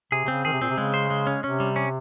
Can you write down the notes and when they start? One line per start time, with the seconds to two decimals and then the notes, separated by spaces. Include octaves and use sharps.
0.12 C3 G#4
0.24 C3
0.28 C#3 C4
0.45 D#3 G#4
0.53 C3
0.61 A#2 C4
0.70 C3
0.77 C#3 G#3
0.94 C5
1.10 G#3
1.27 C#4
1.44 C3 C#4
1.60 G3
1.76 C#4